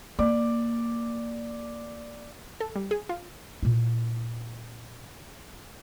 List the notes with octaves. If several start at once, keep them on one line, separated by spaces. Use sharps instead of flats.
A#3 D5
A4
G3
G#4
F4
A#2 E4